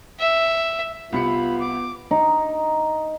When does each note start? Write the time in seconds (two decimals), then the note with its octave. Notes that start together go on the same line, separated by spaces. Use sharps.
0.19 E5
1.12 C2 C3 B3 F4 B5 C#7
1.59 D6
2.11 D#4